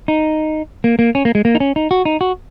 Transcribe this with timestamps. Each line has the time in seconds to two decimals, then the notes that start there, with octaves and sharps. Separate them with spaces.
0.08 D#4
0.84 A#3
0.99 A#3
1.15 C#4
1.25 A#3
1.35 G#3
1.45 A#3
1.55 D#4
1.60 C#4
1.76 D#4
1.91 F#4
2.05 D#4
2.21 F#4